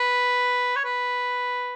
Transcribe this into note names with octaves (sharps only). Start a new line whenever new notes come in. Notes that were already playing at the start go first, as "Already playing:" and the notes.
Already playing: B4
C#5
B4